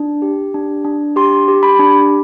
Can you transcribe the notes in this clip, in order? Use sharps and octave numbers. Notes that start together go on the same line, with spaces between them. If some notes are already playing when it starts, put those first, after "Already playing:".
Already playing: D4
G4
D4
D4
G4 C6
G4
B5
D4